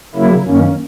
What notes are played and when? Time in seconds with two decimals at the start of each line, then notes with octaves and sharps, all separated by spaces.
0.15 C#3 F#3 A#3 E4
0.46 F#2 D#3 A#3 C#4